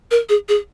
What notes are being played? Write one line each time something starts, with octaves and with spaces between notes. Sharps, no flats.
A#4
G#4
G#4